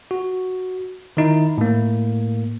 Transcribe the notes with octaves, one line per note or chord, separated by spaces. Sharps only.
F#4
D#3 D#4 E4
A2 A#3